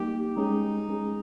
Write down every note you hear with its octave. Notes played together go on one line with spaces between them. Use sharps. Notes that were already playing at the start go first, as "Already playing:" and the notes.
Already playing: G3 A#3 D#4 G4
G#3 C#4 D#4 G#4
G#3 C#4 G#4